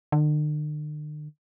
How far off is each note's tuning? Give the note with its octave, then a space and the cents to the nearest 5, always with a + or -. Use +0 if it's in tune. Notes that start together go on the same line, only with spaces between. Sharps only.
D3 +45